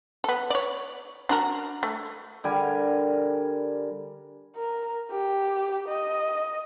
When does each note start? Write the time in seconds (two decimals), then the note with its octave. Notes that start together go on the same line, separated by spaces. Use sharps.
0.24 B3 A4
0.50 C#5 D5
1.29 D4 F#4 A#4
1.83 A3
2.44 D3 G3 A#4 G#5
4.56 A#4
5.11 G4
5.88 D#5